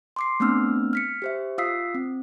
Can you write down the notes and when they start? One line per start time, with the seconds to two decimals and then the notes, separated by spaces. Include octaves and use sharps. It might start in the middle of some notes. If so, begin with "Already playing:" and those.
0.16 C6 D6 C7
0.40 A3 B3 C4 D4 E6 F6
0.93 F6 B6 C#7
1.22 G4 C5 E5
1.58 F4 F5 D#6 E6 B6 C7
1.95 C4